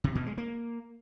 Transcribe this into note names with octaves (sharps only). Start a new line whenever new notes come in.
C3
B2
G#3
A#3